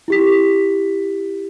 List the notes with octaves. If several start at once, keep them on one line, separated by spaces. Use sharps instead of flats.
E4 G4 B6